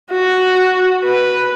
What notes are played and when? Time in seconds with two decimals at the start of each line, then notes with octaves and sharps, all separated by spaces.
0.11 F#4
1.04 B4